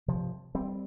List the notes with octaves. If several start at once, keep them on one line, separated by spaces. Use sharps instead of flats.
C3 F3
G3 C4